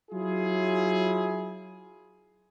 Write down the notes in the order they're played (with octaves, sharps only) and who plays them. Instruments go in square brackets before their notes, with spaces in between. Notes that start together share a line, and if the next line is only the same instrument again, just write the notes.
[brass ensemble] F#3 E4 F4 G#4